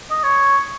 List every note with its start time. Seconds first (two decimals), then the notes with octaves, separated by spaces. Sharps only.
0.10 D#5
0.23 C#5